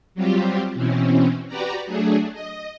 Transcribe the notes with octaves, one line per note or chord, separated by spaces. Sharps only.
F#3 G3 C4 F4 G4
B2 E3 C4 C#4
F#4 G4 B4 D5 A#5
F#3 A3 D4 G#4
D#5